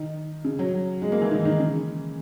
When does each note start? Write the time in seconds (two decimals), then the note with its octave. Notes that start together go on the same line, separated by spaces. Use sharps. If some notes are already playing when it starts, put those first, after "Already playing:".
Already playing: D#3
0.45 C#3
0.59 F#3
1.02 G#3
1.12 A#3
1.22 E3
1.31 D#3
1.45 D#3
1.59 C#3